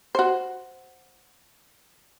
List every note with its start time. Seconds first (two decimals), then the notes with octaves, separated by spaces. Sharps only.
0.15 F#4 C5